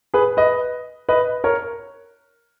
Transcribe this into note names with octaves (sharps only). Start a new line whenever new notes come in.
G#4 B4
B4 D#5
B4 D#5
A#4 C#5